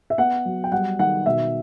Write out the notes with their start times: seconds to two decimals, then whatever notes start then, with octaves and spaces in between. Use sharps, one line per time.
0.10 E5
0.18 B3 F#5
0.45 F#3
0.64 G5
0.72 G3 F#5
0.99 D#3 F#5
1.26 B2 E5